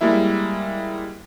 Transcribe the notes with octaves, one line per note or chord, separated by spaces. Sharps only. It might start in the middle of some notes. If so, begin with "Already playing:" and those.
G3 G#3 A#3 E4 E5